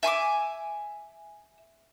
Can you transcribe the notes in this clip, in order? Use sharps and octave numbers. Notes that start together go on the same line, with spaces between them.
E5 G#5 C6 D6